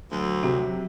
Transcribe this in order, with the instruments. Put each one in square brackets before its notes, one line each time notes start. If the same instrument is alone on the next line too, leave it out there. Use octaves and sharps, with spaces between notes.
[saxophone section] D2 [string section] F#3
[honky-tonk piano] C3 [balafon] F#4